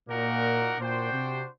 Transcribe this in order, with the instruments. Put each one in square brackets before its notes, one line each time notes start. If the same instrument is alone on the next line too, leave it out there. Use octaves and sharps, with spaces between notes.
[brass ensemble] A#2 [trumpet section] A#3 D#4 F#4 A#4 F#5
[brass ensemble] A#2 [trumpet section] D4 F#4 C5 G5
[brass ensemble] C3